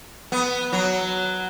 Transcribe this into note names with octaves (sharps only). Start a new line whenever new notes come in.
B3
F#3